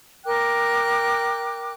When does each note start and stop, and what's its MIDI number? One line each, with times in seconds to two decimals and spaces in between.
0.25 1.73 70
0.25 1.73 79
0.25 1.73 86
0.25 1.73 90